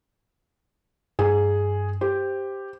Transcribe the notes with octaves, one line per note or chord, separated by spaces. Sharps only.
G2 G#4
G4 C5